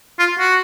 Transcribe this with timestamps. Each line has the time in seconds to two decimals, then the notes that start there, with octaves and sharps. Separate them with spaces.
0.19 F4
0.39 F#4